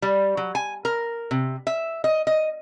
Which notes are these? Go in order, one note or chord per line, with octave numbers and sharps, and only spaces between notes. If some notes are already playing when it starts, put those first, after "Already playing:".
G3
F#3
G#5
A#4
C3
E5
D#5
D#5